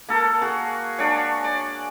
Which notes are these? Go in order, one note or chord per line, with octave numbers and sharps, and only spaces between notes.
A#3 A4 A#4
F#4 G#4
D4 F#4 G#4 C#5
D5